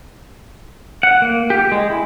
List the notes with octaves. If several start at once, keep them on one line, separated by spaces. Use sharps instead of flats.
F#5
A#3
G4
G#3
E4